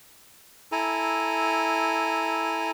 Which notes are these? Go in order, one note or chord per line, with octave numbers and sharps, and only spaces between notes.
E4 A4 G#5 A#5